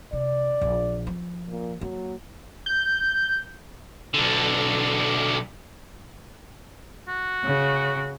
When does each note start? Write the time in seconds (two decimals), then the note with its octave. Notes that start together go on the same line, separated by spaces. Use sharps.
0.13 C3 D5
0.61 A#1
1.07 F3
1.49 A#2
1.81 F#3 A#3
2.66 G6
4.14 B1 D3
7.08 F#4
7.44 C#3